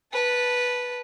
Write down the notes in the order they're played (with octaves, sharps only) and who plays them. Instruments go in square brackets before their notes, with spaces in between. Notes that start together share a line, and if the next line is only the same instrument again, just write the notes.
[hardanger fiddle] B4 A5